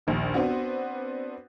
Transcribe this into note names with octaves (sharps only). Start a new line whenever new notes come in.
A#1 D#2 D#3
B3 C4 D4 F#4